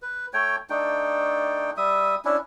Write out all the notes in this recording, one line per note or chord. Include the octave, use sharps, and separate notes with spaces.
B4
A3 C#5 G5
A3 D4 D#4 G5
G3 E5 D#6
C#4 D4 E4